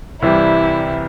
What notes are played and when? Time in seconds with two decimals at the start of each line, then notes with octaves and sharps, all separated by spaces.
0.21 C2 C3 E3 G3 E4